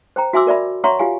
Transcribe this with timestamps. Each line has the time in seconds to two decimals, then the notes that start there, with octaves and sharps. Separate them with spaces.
0.16 C5 G5 A#5
0.33 F#4 E5 G#5 C6 D6 E6
0.47 A#4 D5 E5 B5
0.84 C#5 E5 F#5 A#5 C6 C#6
0.99 F4 G4 F5 G#5